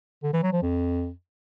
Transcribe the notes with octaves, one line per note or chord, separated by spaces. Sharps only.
D3
E3
F#3
F3
F2